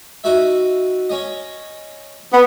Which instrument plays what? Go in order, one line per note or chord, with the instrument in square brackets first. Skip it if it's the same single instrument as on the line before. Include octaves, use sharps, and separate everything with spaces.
[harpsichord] D#4 F#4 E5
C#4 D#5
[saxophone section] B3